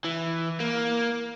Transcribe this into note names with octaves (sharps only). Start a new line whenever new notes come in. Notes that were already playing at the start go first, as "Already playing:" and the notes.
E3
A#3